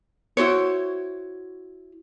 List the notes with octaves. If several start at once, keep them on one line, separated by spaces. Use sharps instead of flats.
E4 F#4 C5 C#5